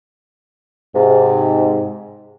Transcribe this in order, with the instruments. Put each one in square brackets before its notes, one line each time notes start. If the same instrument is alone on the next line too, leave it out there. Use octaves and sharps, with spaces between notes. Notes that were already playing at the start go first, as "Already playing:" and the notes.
[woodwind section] G#2 C3